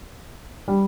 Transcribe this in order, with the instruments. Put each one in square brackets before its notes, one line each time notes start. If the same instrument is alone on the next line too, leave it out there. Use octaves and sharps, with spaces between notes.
[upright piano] G3